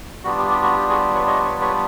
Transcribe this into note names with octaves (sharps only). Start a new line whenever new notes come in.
G3 B3 D4 F4 F#4
G4
G4
F#4
G4
F#4 G#4
B4 C#5
C#5 D#5
B4 C#5
B4 C#5